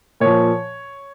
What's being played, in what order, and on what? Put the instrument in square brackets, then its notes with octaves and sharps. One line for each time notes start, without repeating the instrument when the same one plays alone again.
[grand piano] A#2 F3 C#5